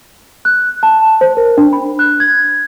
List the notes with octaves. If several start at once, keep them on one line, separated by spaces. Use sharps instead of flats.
F#6
A5
C5
A#4
D4
B5
F#6
G#6